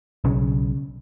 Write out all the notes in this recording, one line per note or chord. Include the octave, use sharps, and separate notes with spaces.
B1 C#3